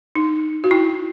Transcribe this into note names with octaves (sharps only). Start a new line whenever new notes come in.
D#4
F#4
E4